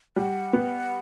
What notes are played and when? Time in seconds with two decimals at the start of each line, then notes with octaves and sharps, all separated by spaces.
0.16 G3 F#5
0.53 B3